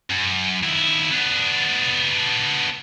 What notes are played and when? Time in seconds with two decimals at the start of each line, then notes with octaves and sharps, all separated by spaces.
0.10 F#2
0.64 D#2 E4
1.11 B3 D4